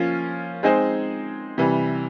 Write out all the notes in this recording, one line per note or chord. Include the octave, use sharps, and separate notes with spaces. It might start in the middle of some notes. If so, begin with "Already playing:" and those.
Already playing: F3 A#3 C#4 F4
G#3 C4 D#4 G#4 C5
C3 E3 G3